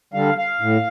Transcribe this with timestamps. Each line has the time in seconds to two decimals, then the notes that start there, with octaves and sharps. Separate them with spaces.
0.14 D3 G3 F5
0.38 F5
0.61 A2